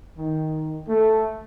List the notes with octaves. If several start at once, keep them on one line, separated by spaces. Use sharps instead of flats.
D#3
A3